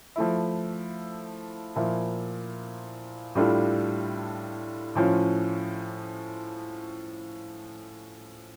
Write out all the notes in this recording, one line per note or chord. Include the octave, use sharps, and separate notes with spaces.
F3 A3 E4
A#2 F3 A#3 E4
A2 G3 D4 F4 A4
A2 F3 C#4 F4